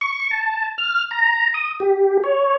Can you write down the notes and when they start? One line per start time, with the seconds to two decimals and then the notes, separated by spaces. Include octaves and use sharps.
0.01 C#6
0.31 A5
0.78 F6
1.11 A#5
1.54 D#6
1.80 G4
2.24 C#5